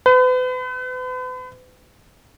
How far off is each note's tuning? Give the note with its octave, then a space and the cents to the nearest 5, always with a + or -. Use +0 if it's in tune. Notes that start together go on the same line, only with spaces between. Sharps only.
B4 +40